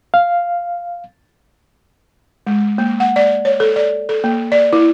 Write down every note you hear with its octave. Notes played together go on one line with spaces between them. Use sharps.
F5
G#3
A#3
F#5
D5
C#5
A4
D5
A4
A#3
D5
E4